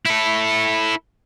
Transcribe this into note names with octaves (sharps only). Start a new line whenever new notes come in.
E4 A4